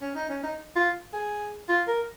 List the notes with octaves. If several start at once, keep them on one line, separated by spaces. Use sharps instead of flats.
C#4
D#4
C#4
D#4
F4
G#4
F4
A#4